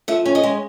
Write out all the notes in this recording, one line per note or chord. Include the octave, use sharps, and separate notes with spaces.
F3 E5
C#4
D#5
G#3